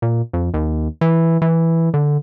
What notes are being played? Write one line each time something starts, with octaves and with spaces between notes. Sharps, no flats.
A#2
F2
D#2
E3
E3
D3